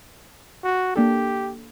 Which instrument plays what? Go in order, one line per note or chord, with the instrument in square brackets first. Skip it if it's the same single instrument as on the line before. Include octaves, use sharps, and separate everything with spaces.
[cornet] F#4
[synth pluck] A#3 D4 A4 [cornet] G4